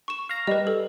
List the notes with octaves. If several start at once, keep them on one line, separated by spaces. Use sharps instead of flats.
C#6 E7
F5 A#5
G3 B4 D#5
A4